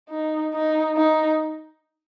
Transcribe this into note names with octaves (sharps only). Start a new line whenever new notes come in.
D#4
D#4
D#4